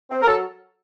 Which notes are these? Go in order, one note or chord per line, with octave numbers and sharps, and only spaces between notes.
C4
A#4
F#3 A4